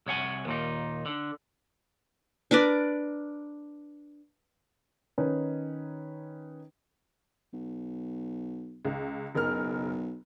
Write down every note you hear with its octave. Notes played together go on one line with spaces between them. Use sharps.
C2 C#5 F#5 G#5
D#2 A#2 D#4
D3
D4 A#4 B4 D5
D#3 C#4 D#4 B4
B1
C#2
F#1 B1 A#4 F6